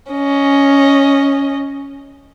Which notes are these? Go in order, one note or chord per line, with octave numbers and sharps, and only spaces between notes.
C#4 D#5